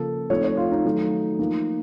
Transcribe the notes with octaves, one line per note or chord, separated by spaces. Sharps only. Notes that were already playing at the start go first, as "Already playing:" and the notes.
Already playing: C#3 F3 A#3 A4
F3 A3 C4 D#4 C#5
C#5
F4
D#4
D#3 F#3 A3
F3 A#3 D#4